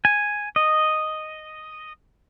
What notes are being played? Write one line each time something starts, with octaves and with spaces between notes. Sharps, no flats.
G#5
D#5